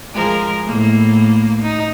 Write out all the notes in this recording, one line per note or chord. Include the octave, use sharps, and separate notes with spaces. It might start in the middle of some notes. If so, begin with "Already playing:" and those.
F3 G#3 A#4
A2 A#3
D#4